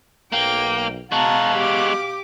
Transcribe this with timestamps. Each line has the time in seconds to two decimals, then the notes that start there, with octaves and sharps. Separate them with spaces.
0.32 B1 A#3 G5
1.12 B2 G#3 F#4 F5 A5 A#5
1.55 G4 D6